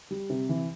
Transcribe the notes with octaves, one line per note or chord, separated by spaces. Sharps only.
G3
C3
E3